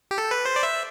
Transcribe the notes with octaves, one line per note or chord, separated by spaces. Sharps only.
G4
A4
B4
C5
D5
E5